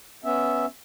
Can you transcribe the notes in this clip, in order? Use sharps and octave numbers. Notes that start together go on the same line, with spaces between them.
B3 C#4 E5